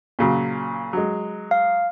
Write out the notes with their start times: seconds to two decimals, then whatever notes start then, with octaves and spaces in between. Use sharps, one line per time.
0.19 A#2 C#3 F#3
0.93 F#3 G#3
1.51 F5